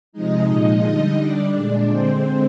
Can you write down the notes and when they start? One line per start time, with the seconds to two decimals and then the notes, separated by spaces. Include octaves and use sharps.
0.12 C3 F3 G#3 D#4 D#5
0.48 A#2 F3 G#3
0.82 D3 G3 D#4 D#5
1.18 D3 G3 D4 D5
1.54 A#2 G#3
1.88 D3 G#3 C4 C5